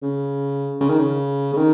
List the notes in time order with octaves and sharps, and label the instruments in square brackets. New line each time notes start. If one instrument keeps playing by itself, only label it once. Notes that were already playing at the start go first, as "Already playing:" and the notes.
[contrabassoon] C#3
C#3
D#3
C#3
C#3
D#3